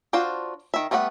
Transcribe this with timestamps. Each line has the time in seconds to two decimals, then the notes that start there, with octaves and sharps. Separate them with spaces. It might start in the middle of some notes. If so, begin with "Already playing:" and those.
0.13 D4 F4 F#4 C5
0.74 D#3 E5
0.91 G3 A3 B3 D5 F#5